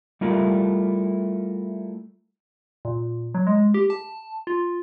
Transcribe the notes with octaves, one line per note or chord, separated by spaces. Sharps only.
G3 A3 E4 F4 A#4
A#2
F#3
G#3
G4
A5
F4